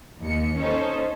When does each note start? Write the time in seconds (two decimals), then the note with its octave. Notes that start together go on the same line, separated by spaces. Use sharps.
0.22 D#2 C#7
0.58 C#4 D#4 A4 C5